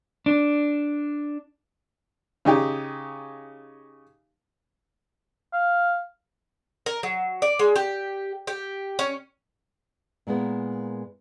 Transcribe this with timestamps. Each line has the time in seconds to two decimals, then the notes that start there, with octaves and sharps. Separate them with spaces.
0.26 D4
2.45 C#3 D#4 G4
5.53 F5
6.86 A#4
7.03 F#3
7.42 D5
7.59 G#3
7.76 G4
8.47 G4
8.99 C#4
10.27 A#2 G#3 A#3 B3 E4